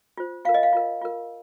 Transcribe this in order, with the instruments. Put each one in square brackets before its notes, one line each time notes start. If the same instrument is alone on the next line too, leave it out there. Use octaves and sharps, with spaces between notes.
[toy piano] F4 C5
F4 A#4 F5
D#5
F5
F4 A#4
F4 A#4